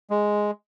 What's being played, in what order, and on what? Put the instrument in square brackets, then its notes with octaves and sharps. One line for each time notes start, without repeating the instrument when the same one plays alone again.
[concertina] G#3